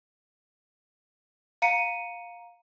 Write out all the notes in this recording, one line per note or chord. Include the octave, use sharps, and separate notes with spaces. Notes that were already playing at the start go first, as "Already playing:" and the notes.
F5 A#5 C#7 D#7